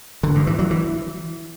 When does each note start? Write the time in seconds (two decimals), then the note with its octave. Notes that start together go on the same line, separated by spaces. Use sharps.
0.23 D3
0.35 G2
0.47 E3
0.59 F#3
0.71 E3